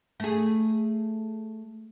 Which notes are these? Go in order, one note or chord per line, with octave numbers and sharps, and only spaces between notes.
A3 G#4